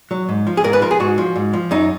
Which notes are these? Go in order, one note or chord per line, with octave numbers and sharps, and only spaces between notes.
F#3
G#2
F3
G#4
G#2 A#4
B4
F3 A#4
G#4
G#2 F#4
F3
G#2
F3
F#2 D#4